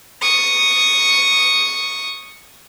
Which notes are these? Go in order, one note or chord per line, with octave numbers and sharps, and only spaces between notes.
C#6 D#6